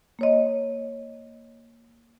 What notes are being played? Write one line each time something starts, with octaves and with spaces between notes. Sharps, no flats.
A#3 C#5 D#5